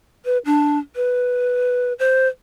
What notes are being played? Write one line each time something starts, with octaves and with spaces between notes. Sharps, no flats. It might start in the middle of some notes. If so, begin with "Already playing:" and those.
B4
D4
B4
C5